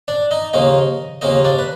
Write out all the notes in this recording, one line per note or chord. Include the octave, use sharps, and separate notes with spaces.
D4 D5
D#4 D#5
D#2 C#3 F3 A#3 D#4 D#5
D#2 C#3 F3 A#3 D#4 D#5
D4 D5
B4